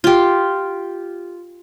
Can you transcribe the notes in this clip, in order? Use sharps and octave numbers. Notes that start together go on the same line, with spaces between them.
F4 G4